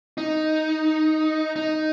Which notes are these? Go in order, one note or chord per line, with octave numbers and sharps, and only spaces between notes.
D#4
D#4